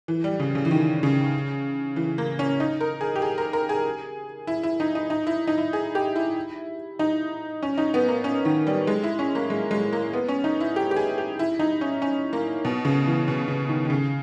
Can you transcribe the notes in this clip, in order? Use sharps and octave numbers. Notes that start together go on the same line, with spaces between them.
E3
G3
C#3
C#3
E3
D#3
C#3
E3
A#3
C#4
D#4
A#4
G#4
G4
G#4
A#4
A#4
G#4
E4
E4
D#4
D#4
D#4
E4
D#4
E4
G#4
G4
E4
D#4
C#4
D#4
B3
A#3
C#4
D#3
G3
G#3
E4
C#4
A#3
G#3
G#3
A#3
B3
C#4
D#4
E4
G4
G4
G#4
G4
E4
D#4
C#4
C#4
A#3
B2
C#3
E3
B2
C#3
D#3
D#3
C#3